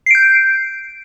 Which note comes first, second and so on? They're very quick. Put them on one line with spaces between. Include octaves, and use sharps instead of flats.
C7 D7 G6